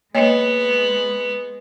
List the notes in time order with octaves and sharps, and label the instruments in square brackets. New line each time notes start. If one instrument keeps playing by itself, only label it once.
[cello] G#3 [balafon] A#3 C#5 D#5 [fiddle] B3